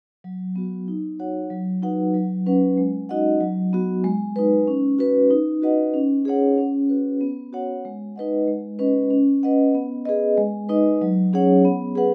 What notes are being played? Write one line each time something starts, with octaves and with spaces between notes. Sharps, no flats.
F#3
B3 F#4
D#4
F#4 C#5 F#5
F#3
D#4 F#4 B4 F#5
F#3
C#4 B4 F#5
G#3
D#4 F#4 D#5 F#5
F#3
B3 F#4
G#3
D#4 B4
C#4
F#4 B4
D#4
F#4 B4 D#5 F#5
C#4
G#4 C#5 F#5
C#4
F#4 B4
B3
F#4 C#5 F#5
G#3
D#4 B4 D#5 F#5
G#3
C#4 B4 D#5
C#4
B4 D#5 F#5
B3
G#4 B4 D#5
G#3
D#4 B4 D#5
F#3
C#4 G#4 C#5 F#5
B3
G#4 B4 F#5